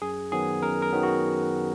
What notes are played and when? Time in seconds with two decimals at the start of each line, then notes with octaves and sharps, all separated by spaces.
0.02 F#2 G#4
0.32 D#3 F#3 B3 G#4
0.63 F#2 A#4
0.82 A#4
0.93 D#3 F#3 B3
1.03 F#4